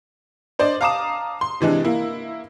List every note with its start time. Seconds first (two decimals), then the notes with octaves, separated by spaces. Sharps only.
0.59 D4 C5 D5 D#5
0.81 F5 A5 A#5 D6 D#6 E7
1.41 C6
1.61 C3 E3 G#3 D4
1.85 A#3 E4